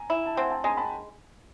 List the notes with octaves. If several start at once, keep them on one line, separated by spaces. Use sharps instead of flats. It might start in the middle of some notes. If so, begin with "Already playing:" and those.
Already playing: G#5 A#5
E4
A5
C4 F#5 G#5
G5 A5
G#3 G#5 A#5
A5 B5